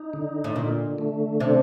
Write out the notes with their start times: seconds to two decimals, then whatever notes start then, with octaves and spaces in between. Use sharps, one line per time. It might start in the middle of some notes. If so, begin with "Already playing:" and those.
Already playing: D#4
0.13 D3
0.44 A2
0.56 A#2 D3
0.98 A3
1.40 C3 D4